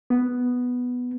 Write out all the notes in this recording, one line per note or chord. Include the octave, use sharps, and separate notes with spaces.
B3